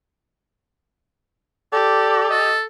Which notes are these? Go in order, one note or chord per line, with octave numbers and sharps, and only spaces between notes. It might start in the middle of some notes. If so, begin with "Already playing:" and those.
G4 A4 D5
A4 D#5